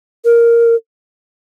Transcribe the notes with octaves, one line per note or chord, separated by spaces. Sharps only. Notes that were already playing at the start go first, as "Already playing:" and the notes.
A#4